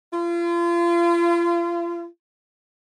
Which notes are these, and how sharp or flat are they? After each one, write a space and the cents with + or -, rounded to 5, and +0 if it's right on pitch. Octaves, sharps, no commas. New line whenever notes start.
F4 -35